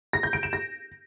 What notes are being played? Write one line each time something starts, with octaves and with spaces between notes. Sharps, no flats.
A#6
G6
D7
E7
A#6